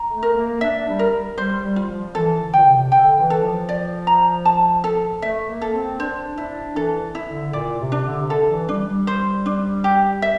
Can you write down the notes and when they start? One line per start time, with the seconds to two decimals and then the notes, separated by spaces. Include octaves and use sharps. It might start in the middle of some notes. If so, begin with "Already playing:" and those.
Already playing: A#5
0.10 A3
0.23 A#4
0.35 A#3
0.61 D4 E5
0.87 G3
0.99 A#4
1.38 G3 C5
1.63 G3
1.76 F4
1.89 F3
2.15 E3 A4
2.40 D3
2.53 A#2 G5
2.66 C3
2.92 D3 G5
3.17 E3
3.30 A4
3.43 F3
3.69 D5
4.07 A#5
4.45 A5
4.84 A4
5.22 A3 E5
5.48 A#3
5.61 A4
5.74 C4
5.99 D4 C5
6.38 D4 E4
6.76 E3 A4
7.15 E4
7.28 D3
7.53 A#2 D5
7.79 C3
7.92 D4
8.04 D3
8.21 C3
8.30 D3 A4
8.50 E3
8.68 G3 D4
8.89 G3
9.07 C5
9.46 D4
9.84 G4
10.22 E5